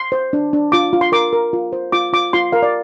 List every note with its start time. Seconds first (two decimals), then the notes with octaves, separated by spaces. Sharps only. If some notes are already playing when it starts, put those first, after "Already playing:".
Already playing: C6
0.12 C5
0.33 D4
0.53 D4
0.72 F4 D6
0.93 F4
1.01 C6
1.12 A#4 D6
1.33 A#4
1.53 F4
1.73 C5
1.92 F4 D6
2.13 F4 D6
2.33 F4 C6
2.52 A#4 F5
2.62 D5